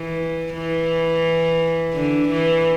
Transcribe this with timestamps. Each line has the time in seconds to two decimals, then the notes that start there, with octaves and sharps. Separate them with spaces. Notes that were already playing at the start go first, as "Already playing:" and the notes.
Already playing: E3
0.54 E3
1.94 D3
2.29 E3